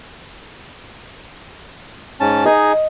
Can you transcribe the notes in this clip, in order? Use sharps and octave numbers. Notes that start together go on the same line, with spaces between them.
G#2 C#4 A5
D#4 G#4 D#5